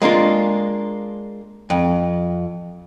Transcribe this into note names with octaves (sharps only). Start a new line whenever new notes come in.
G#3 A#3 D4 F4
F2